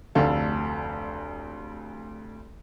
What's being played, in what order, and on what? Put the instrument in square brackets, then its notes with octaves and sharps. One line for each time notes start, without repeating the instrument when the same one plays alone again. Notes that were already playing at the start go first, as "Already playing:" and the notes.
[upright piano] F1 D2 A4 F5